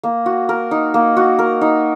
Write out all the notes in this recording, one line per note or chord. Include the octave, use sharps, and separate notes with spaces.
A#3
F#4
A#4
D#4
A#3
F#4
A#4
D#4